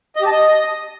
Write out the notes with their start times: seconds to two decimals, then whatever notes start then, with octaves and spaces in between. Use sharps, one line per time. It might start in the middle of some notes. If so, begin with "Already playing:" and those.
0.16 D#5
0.21 G4
0.26 A5
0.32 D#5